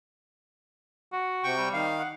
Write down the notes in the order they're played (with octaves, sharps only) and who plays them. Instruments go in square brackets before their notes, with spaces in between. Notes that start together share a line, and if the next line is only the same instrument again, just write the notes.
[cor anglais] F#4
[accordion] C3 G5 C#6
[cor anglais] G3
[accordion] D#3 F5
[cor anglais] F#5